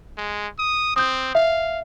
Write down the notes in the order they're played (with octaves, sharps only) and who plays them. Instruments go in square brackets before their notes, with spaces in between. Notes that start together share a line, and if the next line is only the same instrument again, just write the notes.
[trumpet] G#3
D#6
[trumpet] C4 [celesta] D#6 G6
[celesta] E5 [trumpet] F5